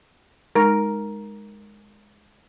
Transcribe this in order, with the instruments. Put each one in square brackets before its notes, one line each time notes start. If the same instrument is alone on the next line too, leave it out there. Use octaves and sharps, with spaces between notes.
[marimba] G#3 D#4 [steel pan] A#4